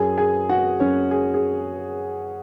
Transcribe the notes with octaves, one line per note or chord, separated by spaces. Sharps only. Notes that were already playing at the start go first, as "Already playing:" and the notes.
Already playing: F#2 F#3 G#4 G#5
G#4 G#5
F#4 F#5
F#2 F#3 C#4 C#5
G#4
G#4